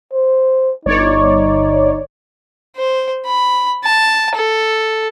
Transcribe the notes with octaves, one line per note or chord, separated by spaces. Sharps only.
C5
G1 D#4 C#5 D5
C5
B5
A5
A4